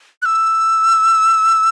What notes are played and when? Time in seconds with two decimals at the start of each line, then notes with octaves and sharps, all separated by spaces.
0.22 F#6
0.25 E6